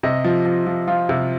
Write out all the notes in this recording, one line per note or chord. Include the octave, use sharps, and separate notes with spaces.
C3 D#5
F3
F3
F3
F3 F4
C3